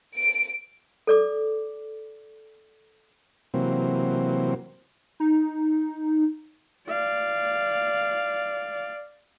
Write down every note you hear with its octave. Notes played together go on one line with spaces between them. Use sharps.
D7
A4 D5 D6
C3 E3 F#3 A#3 C4
D#4
D5 F5